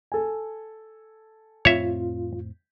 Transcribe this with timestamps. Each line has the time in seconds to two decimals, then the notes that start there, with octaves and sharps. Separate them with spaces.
0.12 A4 G#5
1.65 F2 A2 C4 F4 C#5 E5